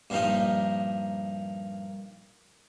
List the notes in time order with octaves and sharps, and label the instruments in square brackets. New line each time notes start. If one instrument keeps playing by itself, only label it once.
[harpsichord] G2 A#2 F3 D#4